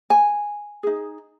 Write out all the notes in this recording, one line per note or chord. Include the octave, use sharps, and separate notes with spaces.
G#5
D#4 G#4